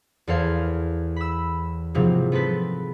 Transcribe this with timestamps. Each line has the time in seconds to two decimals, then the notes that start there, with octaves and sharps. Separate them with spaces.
0.27 E2 A4 C5 F5 G#6
1.16 B5 E6
1.94 G#2 C3 F3 F#3 A#3
2.32 B3 C4 A4 B4